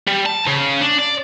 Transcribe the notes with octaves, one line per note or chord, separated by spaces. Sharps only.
G3
A5
C#3
D4
D5